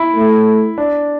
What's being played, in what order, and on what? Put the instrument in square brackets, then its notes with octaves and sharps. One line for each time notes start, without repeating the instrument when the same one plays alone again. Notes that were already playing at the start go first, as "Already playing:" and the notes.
Already playing: [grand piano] E4
[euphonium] A3
[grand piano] D4